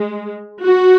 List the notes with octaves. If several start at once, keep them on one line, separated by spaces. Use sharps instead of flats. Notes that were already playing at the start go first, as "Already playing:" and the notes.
Already playing: G#3
F#4